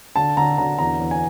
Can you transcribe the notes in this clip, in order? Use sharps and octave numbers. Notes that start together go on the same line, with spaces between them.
D3 A5
D3 A#5
D3 A#5
E2 A#5
E2
G#5